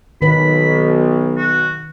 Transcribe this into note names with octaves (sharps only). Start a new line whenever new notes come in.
B1 D#3 B4 B5
F#4